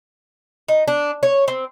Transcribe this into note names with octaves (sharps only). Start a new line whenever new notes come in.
D#4
D4
C#5
C4